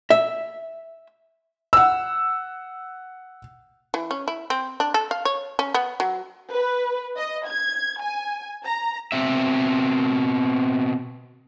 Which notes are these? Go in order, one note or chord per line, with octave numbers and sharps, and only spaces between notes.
E5
F#5 E6
E3
C#4
E4
C4
D4
A4
F5
C#5
C#4
B3
F#3
B4
D#5
G#6
G#5
A#5
B2 C4 E5